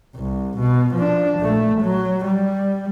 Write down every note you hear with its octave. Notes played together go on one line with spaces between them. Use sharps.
C2
B2
F3 D4
A#1 A3
F#3
G3